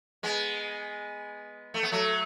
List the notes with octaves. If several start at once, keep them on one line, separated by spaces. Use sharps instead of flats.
G#3 B3
A3
B3
F#3 A3